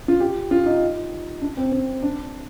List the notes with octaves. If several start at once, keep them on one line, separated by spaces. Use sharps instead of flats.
F4
G4
F4
D#4
D4
C4
C4
D4